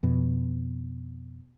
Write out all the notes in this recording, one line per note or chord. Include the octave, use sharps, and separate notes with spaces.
F2 B2